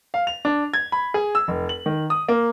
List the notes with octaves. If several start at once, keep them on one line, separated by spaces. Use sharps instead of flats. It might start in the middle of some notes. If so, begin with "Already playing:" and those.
F5
F7
D4
G#6
B5
G#4
E6
F1
F#7
D#3
D#6
A#3